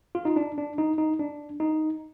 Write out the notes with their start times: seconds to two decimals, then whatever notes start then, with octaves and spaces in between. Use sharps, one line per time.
0.15 F4
0.25 D#4
0.36 D4
0.58 D4
0.78 D#4
0.98 D#4
1.19 D4
1.60 D#4